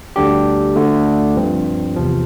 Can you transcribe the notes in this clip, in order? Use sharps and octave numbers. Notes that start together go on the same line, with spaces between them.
D2 D3 G3 D4 G4
D2 D3 A3 D4
G2 F3 C4
E2 C3 F3